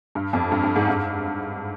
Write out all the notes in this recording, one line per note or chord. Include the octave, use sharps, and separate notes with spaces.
G2
F2
G2
G2
G#2
G2